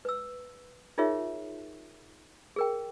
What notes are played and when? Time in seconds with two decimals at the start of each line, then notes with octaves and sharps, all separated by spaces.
0.05 B4 E6
0.98 D#4 F4 G#4 A#4 C#5 E5
2.56 G#4 A#4 G5